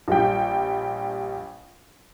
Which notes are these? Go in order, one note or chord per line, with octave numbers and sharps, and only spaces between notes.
A#1 G3 G5